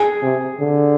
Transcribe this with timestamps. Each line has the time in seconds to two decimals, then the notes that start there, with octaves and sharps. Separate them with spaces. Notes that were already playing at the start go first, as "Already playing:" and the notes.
Already playing: G#4
0.23 C3
0.61 D3